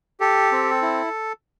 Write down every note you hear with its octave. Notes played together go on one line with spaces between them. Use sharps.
G4 A4
C4
E4